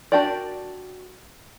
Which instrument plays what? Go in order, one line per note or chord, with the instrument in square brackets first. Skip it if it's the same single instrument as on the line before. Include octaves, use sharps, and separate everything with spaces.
[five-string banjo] D4 F#4 G4 A#4 D5